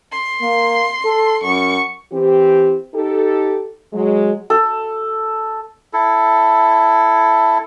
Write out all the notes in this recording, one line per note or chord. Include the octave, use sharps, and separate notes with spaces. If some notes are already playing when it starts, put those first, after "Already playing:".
C6
A#3
A4
F#2 C#6
E3 C4 G4
D#4 G4 A4
F#3 G#3
A4
E4 A4